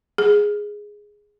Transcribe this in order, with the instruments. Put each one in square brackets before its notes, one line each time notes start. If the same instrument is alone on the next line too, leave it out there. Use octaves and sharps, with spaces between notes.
[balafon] G#4